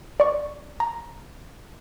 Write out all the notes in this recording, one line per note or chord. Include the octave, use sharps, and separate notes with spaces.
D5 C#6
A#5